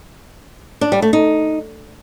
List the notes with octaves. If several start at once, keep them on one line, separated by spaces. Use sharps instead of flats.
D4
G3
A3
D#4